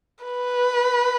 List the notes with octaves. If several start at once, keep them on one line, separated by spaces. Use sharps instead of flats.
B4